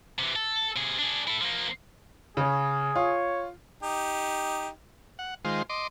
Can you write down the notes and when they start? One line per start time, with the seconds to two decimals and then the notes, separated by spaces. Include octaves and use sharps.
0.19 C3 E3
0.36 A4
0.76 C3 G#4
0.99 D4 G#4
1.27 E4 A4
1.42 F3 A#3
2.37 C#3 C#4 G#4
2.96 F4 C#5
3.83 D#4 G4
5.19 F#5
5.45 D#3 G#3 F4 C5
5.69 D#5 C6 D6